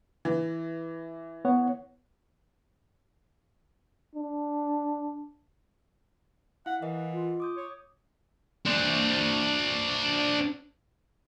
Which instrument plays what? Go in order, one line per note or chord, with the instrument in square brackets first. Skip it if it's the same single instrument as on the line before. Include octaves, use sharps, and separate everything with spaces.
[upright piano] E3
[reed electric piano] B3 C#5 F#5
[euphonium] D4
[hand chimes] E4 F5 [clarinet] F#5
[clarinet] E3 [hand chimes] A#4 D#5 F#5
[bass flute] F4
[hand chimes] D6 D#6 G6
[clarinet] C#5
[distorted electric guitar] D4 C5